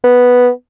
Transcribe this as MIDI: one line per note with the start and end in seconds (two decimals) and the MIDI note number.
0.04 0.50 59